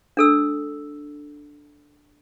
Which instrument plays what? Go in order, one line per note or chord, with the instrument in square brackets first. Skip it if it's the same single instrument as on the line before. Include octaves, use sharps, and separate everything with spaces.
[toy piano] D4 A4 E6